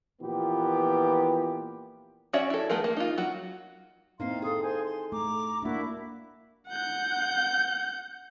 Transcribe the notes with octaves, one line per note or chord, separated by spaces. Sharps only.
A#2 E3 F3 B3 G4
C#4 F#4 C#5 D5 E5
E4 A4
A3 B3 G#4 A#4
A#3
D#4 F4
F#3 F#4
A#3 C4 D#4 E4 F5 C6
G#4 A4 F5 C6 D#6
C5 G#5 C6
C6
A3 A#5 D6
A#3 D4 E4 F#4
F#5 G6